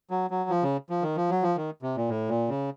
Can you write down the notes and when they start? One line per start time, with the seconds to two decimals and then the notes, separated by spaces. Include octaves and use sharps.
0.10 F#3
0.30 F#3
0.50 F3
0.63 C#3
0.90 F3
1.03 D#3
1.16 F3
1.30 F#3
1.43 F3
1.56 D#3
1.82 C3
1.96 A#2
2.09 A2
2.29 A#2
2.49 C#3